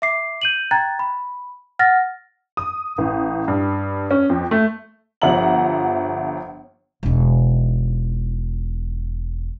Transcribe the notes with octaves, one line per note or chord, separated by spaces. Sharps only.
E5 D6 C7
G6 D#7 F#7
G5 A#5 F#6 G#6 A6
B5
F#5 F6 A6 A#6
D#6
A1
G2
C#4
F2
A3
G1 F3 E5 F#5 A#5 F#7
E1 D#4